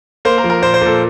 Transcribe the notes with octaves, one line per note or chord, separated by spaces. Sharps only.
A#3 C5
A#4
F3
A#4
A#2 C5
C5
A#2 A4